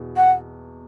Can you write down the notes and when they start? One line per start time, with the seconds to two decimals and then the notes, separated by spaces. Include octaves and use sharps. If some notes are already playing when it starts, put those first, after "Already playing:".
Already playing: E2 B2
0.17 F#5